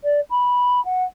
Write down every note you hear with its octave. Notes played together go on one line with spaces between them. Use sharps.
D5
B5
F#5